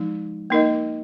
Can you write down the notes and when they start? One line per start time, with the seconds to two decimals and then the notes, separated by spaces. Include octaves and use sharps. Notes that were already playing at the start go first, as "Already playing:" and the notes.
Already playing: F3 G#3 D#4
0.50 A#3 D#4 A#4 D#5